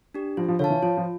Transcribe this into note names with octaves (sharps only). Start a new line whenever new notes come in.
D4 G4
F3 F4
F3
D3 C#5 F5 A5
E3
F3 F4
F3